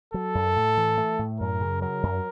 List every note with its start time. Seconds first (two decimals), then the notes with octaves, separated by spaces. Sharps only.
0.14 F#3 A4
0.35 F#2
0.56 A2
0.77 E3
0.98 A3
1.19 A2
1.40 F#2 A#4
1.61 C#3
1.82 F#3 A#4
2.03 F#2